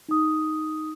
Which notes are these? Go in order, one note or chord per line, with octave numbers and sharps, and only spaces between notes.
D#4 D#6